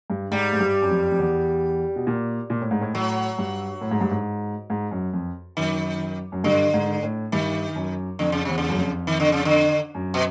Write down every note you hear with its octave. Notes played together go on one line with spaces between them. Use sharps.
G2
G#2 G3
G#2
G2
F#2
F2
F2
E2
B2
A#2
A#2
A2
G#2
A2
A2 F#3
G2
A2
G#2
G2
G#2
G#2
F#2
F2
F#2 D#3
F#2
G2 D3
G#2
A2
G2 D#3
F#2
F2 D3
C#3
E2 C3
C#3
F#2
F2
D#3
D3
C#3
D3
F#2
B2